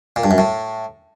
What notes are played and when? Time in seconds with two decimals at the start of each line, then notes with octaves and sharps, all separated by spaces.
0.16 A#2
0.24 G2
0.31 F#2
0.38 A2